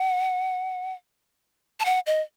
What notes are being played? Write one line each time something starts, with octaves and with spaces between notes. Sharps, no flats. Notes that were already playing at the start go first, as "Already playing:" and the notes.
Already playing: F#5
A5
F#5
D#5